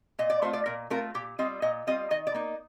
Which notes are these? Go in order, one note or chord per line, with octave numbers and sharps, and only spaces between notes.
A#2 D#5
D5
A3 C4 F4 C5
D5
A#2 A#4
A3 C4 F4 A#4
A#2 G4
G3 C4 F4 D#5
A#2 D#5
G3 C4 F4 D#5
D#3 D#5
D5
A#3 D#4